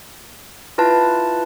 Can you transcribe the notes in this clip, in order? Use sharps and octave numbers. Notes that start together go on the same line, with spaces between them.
E4 F4 B4 A5